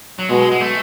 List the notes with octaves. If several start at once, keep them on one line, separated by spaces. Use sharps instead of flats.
F#3
B2 G#3
G#3
A3